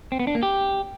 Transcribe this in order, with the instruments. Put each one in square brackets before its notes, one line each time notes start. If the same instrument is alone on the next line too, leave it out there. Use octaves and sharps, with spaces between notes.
[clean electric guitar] C4
B3
D4
A#3
G4